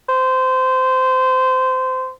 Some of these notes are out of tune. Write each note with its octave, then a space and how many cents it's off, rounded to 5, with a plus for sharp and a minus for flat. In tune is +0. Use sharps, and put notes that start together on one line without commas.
C5 -20